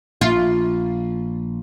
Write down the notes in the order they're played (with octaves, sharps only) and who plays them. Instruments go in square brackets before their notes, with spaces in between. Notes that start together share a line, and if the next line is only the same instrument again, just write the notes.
[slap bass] A#1 [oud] F4